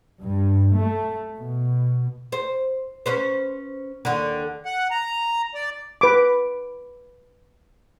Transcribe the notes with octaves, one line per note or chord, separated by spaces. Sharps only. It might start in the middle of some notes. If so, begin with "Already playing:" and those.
G2
A3
B2
C5
C#4 B4 C5
D#2 D3
F#5
A#5
D5
B4 D6